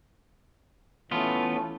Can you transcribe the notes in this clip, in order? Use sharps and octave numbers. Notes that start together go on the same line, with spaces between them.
E3 A3 B3 C#4 F4